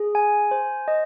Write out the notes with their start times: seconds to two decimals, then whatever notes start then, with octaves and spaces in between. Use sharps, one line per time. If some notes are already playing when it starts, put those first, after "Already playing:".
Already playing: G#4
0.15 G#5
0.51 C5
0.88 D#5